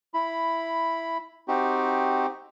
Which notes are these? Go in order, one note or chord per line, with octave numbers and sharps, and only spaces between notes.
E4 B5
C4 D#4 F#4 G4